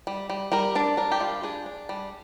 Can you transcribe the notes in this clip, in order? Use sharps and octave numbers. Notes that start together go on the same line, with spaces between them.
G3
G3
G3 A#4
D4 D5
D4 A#4
G4
G3 F4
D4 G#4
D4
G3